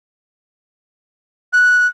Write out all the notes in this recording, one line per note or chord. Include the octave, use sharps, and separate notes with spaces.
F#6